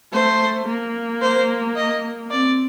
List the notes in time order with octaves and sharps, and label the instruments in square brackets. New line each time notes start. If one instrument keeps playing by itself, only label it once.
[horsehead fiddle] A3 [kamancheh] C5
[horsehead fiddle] A#3
[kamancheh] C5
D#5
[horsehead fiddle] C4 [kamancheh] D5